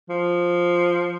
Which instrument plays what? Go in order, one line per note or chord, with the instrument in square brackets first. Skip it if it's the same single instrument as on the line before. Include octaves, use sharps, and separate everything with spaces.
[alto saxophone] F3